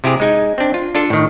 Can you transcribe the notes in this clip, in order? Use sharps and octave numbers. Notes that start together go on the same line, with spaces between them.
C3 E4 G4 G#4
G#3 D#4 G#5
C4 D4
F4
D4 F4 A4
A2 D#3